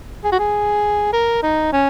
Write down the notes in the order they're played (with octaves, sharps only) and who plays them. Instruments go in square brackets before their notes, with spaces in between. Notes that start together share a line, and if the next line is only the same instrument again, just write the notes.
[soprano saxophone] G#4
F#4
G#4
A#4
D#4
C#4